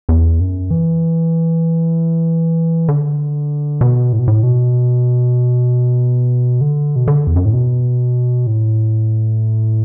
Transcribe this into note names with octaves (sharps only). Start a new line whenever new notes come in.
E2
F#2
E3
D3
B2
A2
B2
A2
B2
D3
B2
D3
E2
F#2
A2
B2
A2